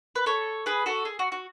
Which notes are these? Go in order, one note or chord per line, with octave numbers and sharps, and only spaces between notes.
B4
A4 C#5
G#4 B4
F#4 A4
G#4
F#4
F#4